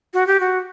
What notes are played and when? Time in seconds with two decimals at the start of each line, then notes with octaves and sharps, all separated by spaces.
0.14 F#4
0.27 G4
0.40 F#4